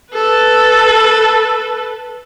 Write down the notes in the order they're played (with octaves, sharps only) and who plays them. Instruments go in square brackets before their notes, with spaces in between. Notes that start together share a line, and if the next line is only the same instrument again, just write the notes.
[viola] A4 B4